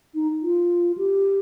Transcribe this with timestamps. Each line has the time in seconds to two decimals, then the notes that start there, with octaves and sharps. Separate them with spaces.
0.15 D#4
0.42 F4
0.97 G4